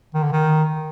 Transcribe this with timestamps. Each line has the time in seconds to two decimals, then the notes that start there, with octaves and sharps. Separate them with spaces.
0.14 D#3
0.23 D3
0.32 D#3